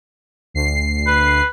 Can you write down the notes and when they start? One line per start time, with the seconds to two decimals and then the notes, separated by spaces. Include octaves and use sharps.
0.54 D2 C7
1.07 B4